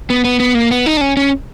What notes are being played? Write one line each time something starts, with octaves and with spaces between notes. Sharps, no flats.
B3
B3
B3
A#3
B3
D#4
D4
C#4
C#4